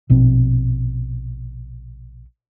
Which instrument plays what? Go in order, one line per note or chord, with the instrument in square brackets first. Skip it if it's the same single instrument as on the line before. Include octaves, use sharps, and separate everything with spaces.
[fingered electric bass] A#1 B2 C4